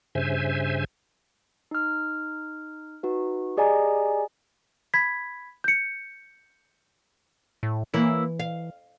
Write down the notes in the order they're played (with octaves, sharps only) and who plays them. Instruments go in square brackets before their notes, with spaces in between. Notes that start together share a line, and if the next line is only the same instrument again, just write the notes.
[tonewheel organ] G2 C#3 C5 E5 G#5
[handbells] D#4 F6
D#4 F#4 B4
G4 G#4 D5 D#5 G#5 A#5
[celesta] B5 G#6 B6
G6 C#7
[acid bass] A2
[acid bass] E3 [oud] A#3 E4 C#5
[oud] F5